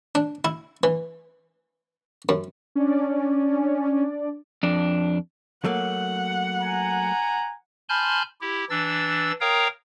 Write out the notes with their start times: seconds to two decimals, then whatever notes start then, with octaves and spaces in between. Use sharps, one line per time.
0.15 D4
0.45 E4
0.83 E3
2.29 F#2
2.76 C#4 D4 D5
4.63 F2 D4
5.64 F#3 A3 A#3 F#5
6.61 G#5 A#5
7.89 G#5 A5 B5 C6 F6 G6
8.41 E4 G4
8.70 E3 D4 E6 A6
9.41 A#4 C#5 F5 G5 A#5 D#6